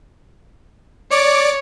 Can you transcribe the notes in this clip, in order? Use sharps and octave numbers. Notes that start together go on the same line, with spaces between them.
C#5 D5 D6